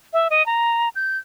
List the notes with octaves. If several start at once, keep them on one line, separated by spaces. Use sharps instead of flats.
E5
D#5
A#5
G6